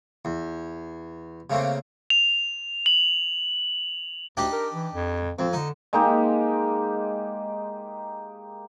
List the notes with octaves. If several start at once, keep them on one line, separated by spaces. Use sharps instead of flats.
E2
C#3 A3 A#3 C4
F7
F#7
D2 D4 D#4 G4
A#4
E3
F2
F2 C4
D3 D#4
G#3 A#3 D#4 G4